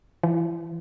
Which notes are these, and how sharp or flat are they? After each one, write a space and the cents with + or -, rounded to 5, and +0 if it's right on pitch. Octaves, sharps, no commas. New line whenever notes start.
E3 +30